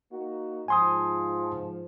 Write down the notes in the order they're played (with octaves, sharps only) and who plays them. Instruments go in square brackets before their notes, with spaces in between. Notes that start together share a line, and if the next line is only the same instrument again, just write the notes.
[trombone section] A#3 D#4 F#4
[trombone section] G#2 F3 [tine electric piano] G#5 C6 D#6